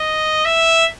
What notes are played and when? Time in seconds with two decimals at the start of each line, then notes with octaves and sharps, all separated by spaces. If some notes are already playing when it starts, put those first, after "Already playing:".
Already playing: D#5
0.46 E5